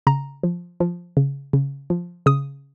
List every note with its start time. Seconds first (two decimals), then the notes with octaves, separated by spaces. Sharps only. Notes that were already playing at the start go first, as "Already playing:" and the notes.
0.07 C#3 A#5
0.43 F3
0.80 F3
1.17 C#3
1.53 C#3
1.90 F3
2.26 C#3 D#6